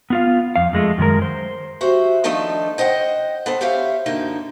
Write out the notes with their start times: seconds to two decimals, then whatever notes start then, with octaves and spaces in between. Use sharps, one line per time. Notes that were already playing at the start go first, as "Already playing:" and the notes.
0.10 B3 F4 F5
0.56 F2 F5
0.73 F2 G#3 A3
0.98 F#2 D#3 G#3 A#4
1.22 C5
1.81 F#4 G4 C5 E5
2.24 D#3 F3 A3 D4 D#4 A4
2.78 C5 D#5 F#5 G5
3.46 B3 A4 C5
3.61 G4 C5 C#5 E5 F5
4.06 F#2 D3 A#3 D#4